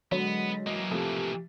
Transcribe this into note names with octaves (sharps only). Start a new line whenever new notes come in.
D3 F#3 G#3 B3
E3 A#3 D#5
C3 F3 A3 G4